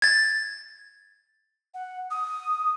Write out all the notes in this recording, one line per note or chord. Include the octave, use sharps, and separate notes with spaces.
G#6 A6
F#5
D#6